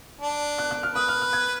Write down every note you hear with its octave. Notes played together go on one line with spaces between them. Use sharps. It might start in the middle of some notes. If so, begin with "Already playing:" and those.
D4
F#6
F#6
F6
B4 D#6
F6
F6
G#6